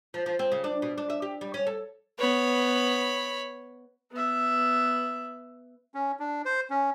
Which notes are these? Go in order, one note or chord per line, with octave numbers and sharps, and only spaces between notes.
F3
F3
C4
C#3
D4
B2
D4
E5
G4
G3
C#4
A4
B3 C#5 B5
B3 E5
C#4
D4
C5
C#4